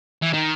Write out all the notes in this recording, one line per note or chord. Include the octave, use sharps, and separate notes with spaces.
E3
D#3